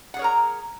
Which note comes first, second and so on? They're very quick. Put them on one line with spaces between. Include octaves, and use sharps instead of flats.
F#5 G#4 C#5 A#4 A#5